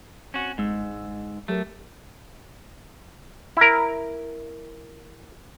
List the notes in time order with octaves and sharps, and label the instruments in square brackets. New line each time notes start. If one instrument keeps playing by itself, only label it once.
[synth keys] C4 G#5 [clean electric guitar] C#4 F#4
[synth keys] G1 G#3 E6 [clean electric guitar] G#2
[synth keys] F#3 G4 A#4 [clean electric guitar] A3
[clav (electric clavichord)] E4 A#4